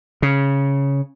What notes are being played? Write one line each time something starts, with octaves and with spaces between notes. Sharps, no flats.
C#3